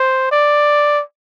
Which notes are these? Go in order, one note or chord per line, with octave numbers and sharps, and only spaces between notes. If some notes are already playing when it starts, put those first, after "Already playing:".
Already playing: C5
D5